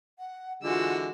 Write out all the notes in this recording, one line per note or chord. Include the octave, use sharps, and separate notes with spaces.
F#5
D3 E3 G#3 F4 F#4 E6